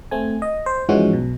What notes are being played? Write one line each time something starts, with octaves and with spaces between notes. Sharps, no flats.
A3 C4 G#5
D#5
C5
G#2 E3 F3 G#3 C#4 F#4
B1 B2